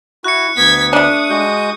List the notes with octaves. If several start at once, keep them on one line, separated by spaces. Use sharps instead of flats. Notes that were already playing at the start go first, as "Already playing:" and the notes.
E4 F#4 F#6 C#7
D2 B3 G#6 B6
A3 D4 D#6
G#3 F#4 G6